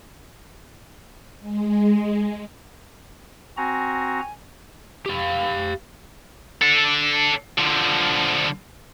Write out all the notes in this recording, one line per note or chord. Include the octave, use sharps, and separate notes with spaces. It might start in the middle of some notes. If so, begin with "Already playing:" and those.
G#3
C4 F#4 G#5 A#5
G4 F5
D4 A4
D3 F3